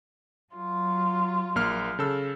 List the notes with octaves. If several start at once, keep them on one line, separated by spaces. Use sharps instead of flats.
F#3 F4
A#1 A#3 F6
C#3 A4 E6